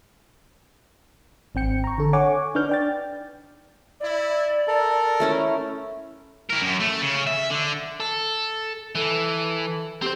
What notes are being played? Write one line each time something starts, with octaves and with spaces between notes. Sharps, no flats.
G#1 C4 G5 C#7
A#5 C#6
D3 A4
C#5 F#5 G#5 C#6 D6
D4 D#4 B4 F6 G6
D5 G5 A6
E4 D5
A4 A#4
A3 C#4 E4
E4 A#4
F#2
A3
C#3
E5
D3
A4
E3 A4
C4 G4 C5